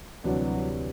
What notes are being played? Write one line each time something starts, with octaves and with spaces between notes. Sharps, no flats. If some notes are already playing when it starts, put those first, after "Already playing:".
D2 C3 E3 F#3 G3 D4